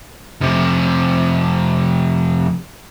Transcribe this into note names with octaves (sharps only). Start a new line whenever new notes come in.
F2 C3